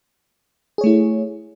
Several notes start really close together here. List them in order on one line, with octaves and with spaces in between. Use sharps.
G#4 C#5 A3 E4